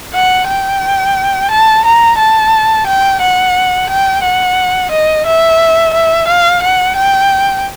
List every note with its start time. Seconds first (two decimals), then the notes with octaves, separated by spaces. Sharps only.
0.14 F#5
0.48 G5
1.51 A5
1.85 A#5
2.18 A5
2.87 G5
3.22 F#5
3.90 G5
4.23 F#5
4.91 D#5
5.26 E5
5.94 E5
6.28 F5
6.63 F#5
6.96 G5